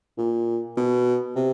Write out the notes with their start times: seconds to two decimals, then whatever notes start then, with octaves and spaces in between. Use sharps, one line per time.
0.18 A#2
0.77 B2
1.36 C3